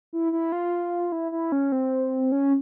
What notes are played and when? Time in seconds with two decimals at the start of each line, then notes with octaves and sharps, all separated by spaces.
0.13 E4
0.32 E4
0.52 F4
1.12 E4
1.32 E4
1.52 C#4
1.72 C4
2.32 C#4